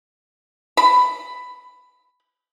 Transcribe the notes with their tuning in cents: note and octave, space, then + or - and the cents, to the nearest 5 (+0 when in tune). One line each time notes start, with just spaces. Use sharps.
B5 +10